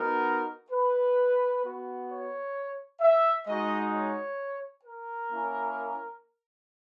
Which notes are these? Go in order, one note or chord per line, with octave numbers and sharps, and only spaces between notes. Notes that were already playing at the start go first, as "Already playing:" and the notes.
Already playing: B3 D#4 F#4 A#4
B4
B3 F#4
C#5
E5
G#3 D#4 F#4 D#5
C#5
A#4
A#3 C#4 E4